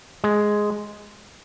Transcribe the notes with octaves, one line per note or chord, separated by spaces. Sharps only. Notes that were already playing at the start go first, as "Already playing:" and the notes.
G#3